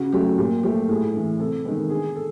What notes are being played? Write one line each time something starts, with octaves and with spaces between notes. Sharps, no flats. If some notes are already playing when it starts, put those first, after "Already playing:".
Already playing: C#3 F#4
F#3 A3 G4
A#2 G4
F3 A3 G4
A2 G#4
E3 A3
C3 A4
D#3 G#3 B3
D3 G#4
A4